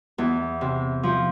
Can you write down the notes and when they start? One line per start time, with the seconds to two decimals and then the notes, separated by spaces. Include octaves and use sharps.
0.18 E2
0.61 C3
1.03 F3